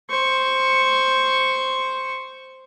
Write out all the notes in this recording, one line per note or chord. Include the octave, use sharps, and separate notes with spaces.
C5 C#6